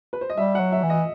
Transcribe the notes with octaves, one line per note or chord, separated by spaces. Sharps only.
B4
C5
D#5
G3 E5
F#5
F#3
E5
E3
D#5